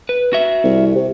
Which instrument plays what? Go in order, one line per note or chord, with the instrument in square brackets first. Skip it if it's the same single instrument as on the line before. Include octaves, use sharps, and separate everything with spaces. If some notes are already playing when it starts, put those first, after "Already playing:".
[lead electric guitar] B4
F#4 E5
[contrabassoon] C2
C3